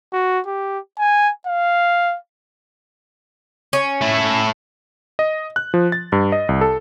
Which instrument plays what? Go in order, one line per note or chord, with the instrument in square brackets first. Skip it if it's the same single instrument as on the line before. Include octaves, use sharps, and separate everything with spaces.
[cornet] F#4
G4
G#5
F5
[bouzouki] C#4
[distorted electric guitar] A3 E4
[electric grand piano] D#5
F#6
F3
A6
G2
D#5
C2
A4